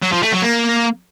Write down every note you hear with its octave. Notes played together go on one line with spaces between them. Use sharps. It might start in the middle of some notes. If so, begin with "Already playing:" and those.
F#3
F3
A3
F#3
A#3